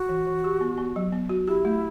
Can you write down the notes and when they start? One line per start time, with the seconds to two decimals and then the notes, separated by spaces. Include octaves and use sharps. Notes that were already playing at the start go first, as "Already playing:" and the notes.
Already playing: F#4
0.09 E3
0.27 E3
0.44 G4
0.61 B3
0.78 B3
0.96 F#3
1.12 B3
1.29 F#4
1.47 E4 G4
1.65 A3